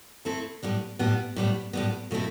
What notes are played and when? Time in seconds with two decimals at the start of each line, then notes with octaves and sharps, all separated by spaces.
0.25 A3 C4 E4 A4
0.63 A2 G3 B3
0.99 A2 G3 B3
1.36 A2 G3 B3
1.73 A2 G3 B3
2.11 B2 A3 C4 E4